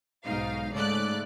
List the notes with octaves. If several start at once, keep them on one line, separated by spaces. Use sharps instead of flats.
B1 G#2 D#4 F5
G#2 C#3 A3 D5 F#6